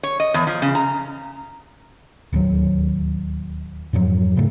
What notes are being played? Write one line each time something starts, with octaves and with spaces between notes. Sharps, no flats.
C#5
D#5
E2
F3
C#3
A#5
D1 D#2 F#3
F2 G#2 F3 F#3
A2 C#3 A3